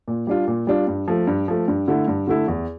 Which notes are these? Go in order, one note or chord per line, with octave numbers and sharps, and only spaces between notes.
A#2
G3 D4 F4
A#2
G3 D4 F4
G2
F3 A3
G2
F3 A3
G2
D3 A3 E4
G2
D3 A3 E4
E2